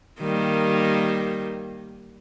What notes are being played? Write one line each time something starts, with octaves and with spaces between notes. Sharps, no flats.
D#3 G3 A#3